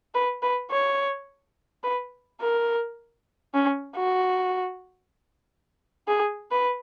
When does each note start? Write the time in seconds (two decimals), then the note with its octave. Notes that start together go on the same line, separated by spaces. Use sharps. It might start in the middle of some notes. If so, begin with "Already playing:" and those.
0.15 B4
0.43 B4
0.71 C#5
1.84 B4
2.41 A#4
3.54 C#4
3.96 F#4
6.08 G#4
6.51 B4